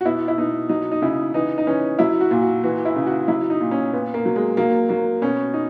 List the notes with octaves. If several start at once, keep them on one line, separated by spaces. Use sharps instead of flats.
F#4
B2 E4
E4
B2 D#4
F#3 D#4
D#4
C#3 E4
E3 D#4
D#4
E3 C#4
F#3 E4
F#4
A#2
F#4
E3 F#4
E4
C#3
F#4
F#3 E4
D#4
A#2
C#4
A#2 B3
A#3
F#3
G#3
F#3 A#3
F#3 A#3
B2 C#4
D#4